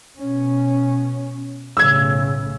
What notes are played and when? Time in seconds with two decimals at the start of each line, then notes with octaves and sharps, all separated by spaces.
0.19 B2 C#4
1.77 B1 A2 C#3 E6 G#6